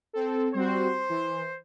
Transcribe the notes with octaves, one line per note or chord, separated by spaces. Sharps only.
C4 A4
G3 C4 F#4 C5
E3